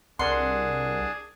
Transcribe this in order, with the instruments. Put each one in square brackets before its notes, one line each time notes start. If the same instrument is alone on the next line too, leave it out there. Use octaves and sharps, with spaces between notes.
[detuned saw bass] C2 [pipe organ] D4 G#4 [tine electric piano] A#4 D5 F#5 [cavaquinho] C6